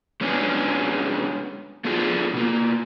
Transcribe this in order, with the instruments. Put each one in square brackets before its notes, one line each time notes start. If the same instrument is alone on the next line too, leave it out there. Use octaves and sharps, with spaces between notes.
[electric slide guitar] G#3 B3 C#4 D4 G#4
A3 B3 D4 F4 G#4
B2 A#3